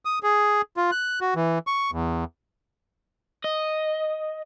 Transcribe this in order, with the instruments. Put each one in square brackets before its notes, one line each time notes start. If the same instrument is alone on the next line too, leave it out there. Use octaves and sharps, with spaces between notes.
[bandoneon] D#6
G#4
F4
F#6
F#4
E3
C#6
E2
[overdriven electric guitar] D#5